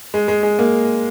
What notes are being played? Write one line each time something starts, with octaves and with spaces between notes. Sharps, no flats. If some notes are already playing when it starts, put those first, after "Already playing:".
G#3
G#3
G#3
A#3